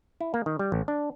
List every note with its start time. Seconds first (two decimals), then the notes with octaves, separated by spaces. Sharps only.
0.21 E4
0.34 A#3
0.46 D#3
0.59 G3
0.72 A1
0.88 D4